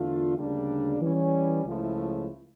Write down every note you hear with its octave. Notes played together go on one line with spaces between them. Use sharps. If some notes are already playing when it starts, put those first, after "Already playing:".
Already playing: E2 D3 A3 D4 F4
D2 C#3 G3 A#3 D4
E3 G3 C#4
C#2 C#3 F3 A3 E4